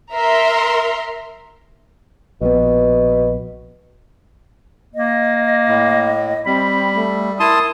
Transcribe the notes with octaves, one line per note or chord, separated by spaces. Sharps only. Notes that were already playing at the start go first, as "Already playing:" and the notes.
A#4 E5 A#5 C6
A#1 B2 B3
A#3 D#5
A2
G3 C4 B5
A3
E4 A#4 A5 C6 D#6